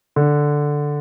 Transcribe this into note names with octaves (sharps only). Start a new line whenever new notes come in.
D3